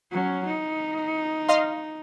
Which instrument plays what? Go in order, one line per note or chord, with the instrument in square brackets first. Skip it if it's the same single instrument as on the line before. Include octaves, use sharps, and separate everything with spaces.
[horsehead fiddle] F#3 C#4
D#4
[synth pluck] D#5 F5 C6